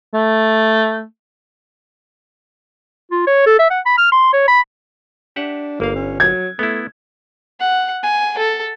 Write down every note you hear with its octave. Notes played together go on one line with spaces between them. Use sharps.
A3
F4
C#5
A4
E5
F#5
B5
F6
C6
C#5
B5
D4 G4 E5 F#5
G1 A#3 F5
C#4
F#3 G#6
A3 B3 E4
F#5
G#5
A4